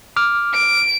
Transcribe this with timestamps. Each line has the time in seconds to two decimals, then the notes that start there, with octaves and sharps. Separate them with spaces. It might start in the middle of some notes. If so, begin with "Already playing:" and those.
0.16 D6 F6
0.53 D7